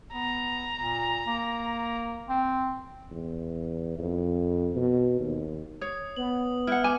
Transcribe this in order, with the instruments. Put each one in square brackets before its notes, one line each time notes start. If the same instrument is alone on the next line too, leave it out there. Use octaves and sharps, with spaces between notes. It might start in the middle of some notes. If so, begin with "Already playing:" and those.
[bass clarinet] B3 [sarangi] A#5
[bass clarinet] A#2
A#3
C4
[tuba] E2
F2
B2
D#2
[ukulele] C#5 [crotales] D#6
[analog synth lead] B3 [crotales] F#7
[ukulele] E4 F#5 [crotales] F6 F#6
[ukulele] G#5 [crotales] D6